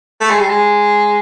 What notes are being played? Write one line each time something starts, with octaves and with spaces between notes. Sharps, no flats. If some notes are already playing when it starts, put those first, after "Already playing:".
A3
G#3
G3
G#3